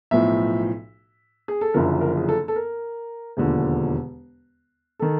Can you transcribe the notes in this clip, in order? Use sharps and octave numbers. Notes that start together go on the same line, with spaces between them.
B1 A2 F3 E5
G#4
A4
F#1 F#2 D3 F3 A#4
A#4
G#4
A4
A4
A#4
E1 D#2 D3 F3
D#3 A4